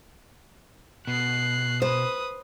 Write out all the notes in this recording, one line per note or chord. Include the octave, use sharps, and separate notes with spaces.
B2 F#6 C7
B4 C5 D#6